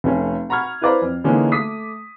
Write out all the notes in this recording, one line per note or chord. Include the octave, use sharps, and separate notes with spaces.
F1 A3 C#4
F#5 A#5 B5 C#6 F6 G#6
E4 B4 C5 D5 F5 A#5
F2
D3 E3 G#3 A#3 C#4 D#4
A3 D6 D#6 B6